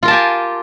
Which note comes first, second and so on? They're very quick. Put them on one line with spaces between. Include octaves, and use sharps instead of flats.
F4 A#4 A5 G4 G#5